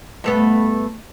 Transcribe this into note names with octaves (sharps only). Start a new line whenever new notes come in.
G2 A3 B3